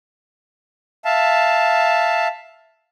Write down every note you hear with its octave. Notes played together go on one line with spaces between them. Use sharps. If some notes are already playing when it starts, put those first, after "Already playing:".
E5 F5 A5